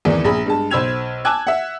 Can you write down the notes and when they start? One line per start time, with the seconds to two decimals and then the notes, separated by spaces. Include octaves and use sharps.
0.05 G#1 E2 E3 D5
0.24 A#1 G#4 A#5 B5
0.46 G2 G#3 A5
0.71 B1 C5 B5 E6 G#6 F7
1.25 G#5 A5 D6 E6 F#6 G#6
1.47 E5 F#5